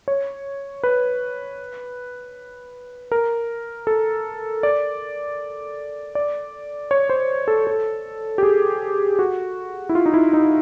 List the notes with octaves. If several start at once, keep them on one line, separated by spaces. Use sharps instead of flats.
C#5
B4
A#4
A4
D5
D5
C#5
C5
A4
A4
G4
G#4
F#4
E4
F4
D#4
E4
D#4